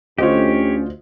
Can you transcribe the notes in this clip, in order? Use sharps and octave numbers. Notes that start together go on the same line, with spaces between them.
D2 C#4 F4 G4 C5 C#5 D#5